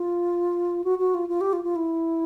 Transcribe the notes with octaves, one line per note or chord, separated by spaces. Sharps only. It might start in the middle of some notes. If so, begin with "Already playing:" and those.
Already playing: F4
F#4
F#4
F4
F4
G4
F4
F4
E4